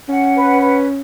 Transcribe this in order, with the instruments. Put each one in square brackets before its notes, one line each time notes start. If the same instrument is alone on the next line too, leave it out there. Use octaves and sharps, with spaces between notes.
[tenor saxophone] C#4 [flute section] F#5
[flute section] B4
B4